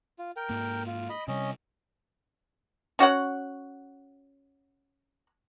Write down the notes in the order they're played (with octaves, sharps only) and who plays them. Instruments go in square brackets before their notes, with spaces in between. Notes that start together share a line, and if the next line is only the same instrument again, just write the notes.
[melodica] F4
A#4 G5
[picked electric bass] G#2 A#3
[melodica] F4
D#5 B5
[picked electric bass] C3 G3 [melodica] C#4 D#5
[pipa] C#4 F#4 C#5 F#5